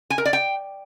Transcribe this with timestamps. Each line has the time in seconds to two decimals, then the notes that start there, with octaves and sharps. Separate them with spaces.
0.10 G#5
0.18 A#4
0.25 D5
0.33 G5